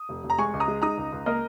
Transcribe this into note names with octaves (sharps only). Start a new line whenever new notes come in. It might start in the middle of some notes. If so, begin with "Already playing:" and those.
Already playing: D#6
F1
F1
A#5
G#3 G#5 C#6
C#2
A#5 D#6
G#3
D#4 A#5 D#6
C#2
C#2
A#3 A#4 D#5